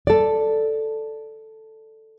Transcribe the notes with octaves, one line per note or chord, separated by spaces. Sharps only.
A4 D5